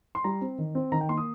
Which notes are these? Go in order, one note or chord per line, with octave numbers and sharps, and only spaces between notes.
C6
G3 A#5
C4
D#3
C4
D#3 A#5
G5
A#3 C6
D#6